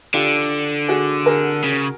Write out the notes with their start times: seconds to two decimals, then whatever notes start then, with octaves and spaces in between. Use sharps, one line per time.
0.14 D3 F4 G4
0.89 F#4 G#4
1.26 G#4 A#4
1.64 C#3